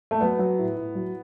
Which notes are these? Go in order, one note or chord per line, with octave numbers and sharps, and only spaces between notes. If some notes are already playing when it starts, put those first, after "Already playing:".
A3
F#3 B3
F#3
A2
A2
F#3